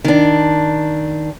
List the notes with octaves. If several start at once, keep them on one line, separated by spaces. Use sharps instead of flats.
D#3 D4